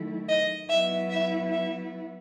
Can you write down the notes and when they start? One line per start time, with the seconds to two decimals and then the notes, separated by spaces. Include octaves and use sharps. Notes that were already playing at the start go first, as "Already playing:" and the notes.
Already playing: D#3 F#3 A3 E4
0.29 D#5
0.69 F#3 B3 E4 E5
1.10 E5
1.52 E5